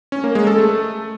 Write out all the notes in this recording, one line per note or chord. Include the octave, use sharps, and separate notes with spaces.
C#4
A#3
G#3
A4
A3